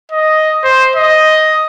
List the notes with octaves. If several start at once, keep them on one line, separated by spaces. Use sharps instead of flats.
D#5
C5
D#5